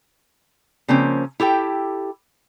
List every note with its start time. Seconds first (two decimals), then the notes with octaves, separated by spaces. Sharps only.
0.88 C#3 F3 A#3 C4 C#4
1.40 E4 G4 A4 G5